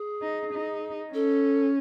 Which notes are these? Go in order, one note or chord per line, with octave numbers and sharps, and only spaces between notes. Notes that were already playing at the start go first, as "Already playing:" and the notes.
Already playing: G#4
D#4
D#4
C#4 A4